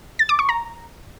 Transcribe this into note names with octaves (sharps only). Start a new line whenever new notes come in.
A6
D6
C#6
A#5